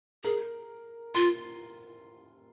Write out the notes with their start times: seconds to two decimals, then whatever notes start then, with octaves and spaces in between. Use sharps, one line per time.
0.24 G#4 A#4
1.15 F4 C6